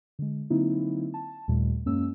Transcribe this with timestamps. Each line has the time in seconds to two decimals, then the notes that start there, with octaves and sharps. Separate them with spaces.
0.19 D3 G#3
0.50 D3 F#3 A#3 C4 D#4 E4
1.14 A5
1.48 D#2 A#2 G3 A3
1.86 F#2 G#3 A#3 C#4 E6